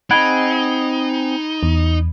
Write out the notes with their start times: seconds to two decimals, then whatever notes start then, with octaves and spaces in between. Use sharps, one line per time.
0.11 C4 D#4 G#4 F#5 B5 G#6 D7
1.63 E2